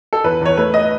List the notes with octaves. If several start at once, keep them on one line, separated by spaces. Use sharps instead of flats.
A4
E2 B4
E2 C#5
A3 B4
D#5